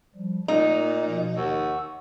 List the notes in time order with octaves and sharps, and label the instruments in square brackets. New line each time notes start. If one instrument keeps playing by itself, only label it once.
[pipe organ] F3 G3
[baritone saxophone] A#2 [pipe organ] A3 [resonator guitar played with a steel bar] D#4
[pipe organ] B2 F3
[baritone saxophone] D#2 [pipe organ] F#5 C#6 E6